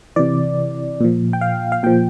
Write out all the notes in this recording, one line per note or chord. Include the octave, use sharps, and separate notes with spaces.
C3 E3 D5
A#2 F3
G5
F5
F5
A#2 F3 G5